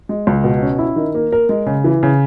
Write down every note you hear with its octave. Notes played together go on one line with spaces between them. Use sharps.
G#3
C#2
B2
C#4
E4
D#3
A#3
A#4
G#3
C#3
E3
C#3